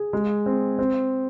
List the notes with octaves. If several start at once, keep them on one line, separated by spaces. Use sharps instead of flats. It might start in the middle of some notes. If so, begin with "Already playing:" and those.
Already playing: G#4
G#3
C4
C4